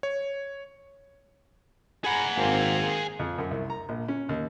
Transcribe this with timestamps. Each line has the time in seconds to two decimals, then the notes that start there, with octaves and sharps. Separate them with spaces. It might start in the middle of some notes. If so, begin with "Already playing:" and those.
0.03 C#5
2.04 G#4 F#5 A#5 B5
2.36 G#1 A#3 C4
3.19 F2
3.38 F#2
3.51 C2
3.70 A#5
3.89 A#1
4.08 C#4
4.29 D#2